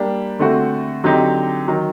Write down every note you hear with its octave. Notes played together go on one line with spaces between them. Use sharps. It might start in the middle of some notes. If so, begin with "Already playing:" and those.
Already playing: G3 A#3 D4 G4
D3 A3 C4 F#4
D3 F#3 C4 D#4 G4
D#3 F#3